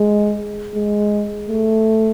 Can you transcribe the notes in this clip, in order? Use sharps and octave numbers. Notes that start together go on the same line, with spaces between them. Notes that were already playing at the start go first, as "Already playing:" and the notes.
Already playing: G#3
G#3
A3